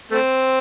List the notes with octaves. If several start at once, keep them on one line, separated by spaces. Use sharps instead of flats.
A3 C4